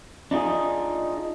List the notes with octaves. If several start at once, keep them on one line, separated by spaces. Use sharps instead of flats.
D4 D#4 F4 G#4